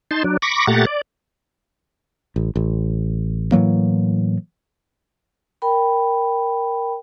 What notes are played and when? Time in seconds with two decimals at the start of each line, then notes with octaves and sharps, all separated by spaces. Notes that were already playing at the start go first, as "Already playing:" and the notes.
0.11 D#4 A5 C6
0.24 F#3 D4
0.42 B5 C#6 D6 A#6
0.67 A#2 A3 G4 F#5 A#5 A6
0.87 D5
2.36 A1
2.56 A1
3.52 A2 E3 F#3 A#3
5.62 A#4 G5 B5